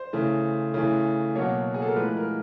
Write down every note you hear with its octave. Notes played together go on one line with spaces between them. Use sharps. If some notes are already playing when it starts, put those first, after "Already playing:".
Already playing: C5
C#3 E3 A3
C#3 E3 A3
B2 F#3 A#3 C#5
G#4
A4
A#4
A2 F3 G#3 B4
A#4